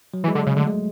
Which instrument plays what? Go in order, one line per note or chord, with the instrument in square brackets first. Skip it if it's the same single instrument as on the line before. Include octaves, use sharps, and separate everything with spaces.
[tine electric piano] F#3
[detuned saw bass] E3
[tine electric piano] G#3
[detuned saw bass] D3
[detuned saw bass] C#3 [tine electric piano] G#3
[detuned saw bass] D3 [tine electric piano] A3
[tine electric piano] G#3